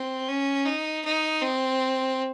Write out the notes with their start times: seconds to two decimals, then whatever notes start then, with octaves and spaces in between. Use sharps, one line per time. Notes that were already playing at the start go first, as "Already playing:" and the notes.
Already playing: C4
0.28 C#4
0.66 D#4
1.04 D#4
1.42 C4